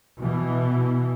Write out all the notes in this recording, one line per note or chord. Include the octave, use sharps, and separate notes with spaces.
B2 E3